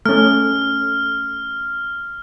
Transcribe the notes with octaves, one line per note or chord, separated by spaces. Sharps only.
A3 C#4 F6